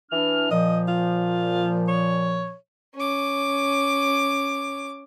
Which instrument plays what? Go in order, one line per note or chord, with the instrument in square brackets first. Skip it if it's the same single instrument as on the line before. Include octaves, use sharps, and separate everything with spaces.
[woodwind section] E3 D4 F6
[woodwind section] A#2 F3 [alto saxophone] D#5
[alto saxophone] F4
C#5
[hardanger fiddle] C#4 D6